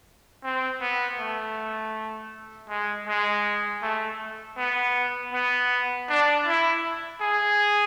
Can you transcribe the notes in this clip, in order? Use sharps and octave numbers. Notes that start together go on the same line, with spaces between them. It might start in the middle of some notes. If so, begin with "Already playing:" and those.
C4
B3
A3
G#3
G#3
A3
B3
B3
D4
E4
G#4